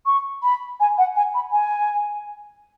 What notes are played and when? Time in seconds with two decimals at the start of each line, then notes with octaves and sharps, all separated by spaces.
0.06 C#6
0.43 B5
0.80 G#5
0.98 F#5
1.16 G#5
1.34 B5
1.52 G#5